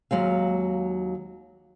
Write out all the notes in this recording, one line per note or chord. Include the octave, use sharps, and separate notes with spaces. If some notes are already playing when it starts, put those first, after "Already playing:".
D#2 F#3 G#3 F5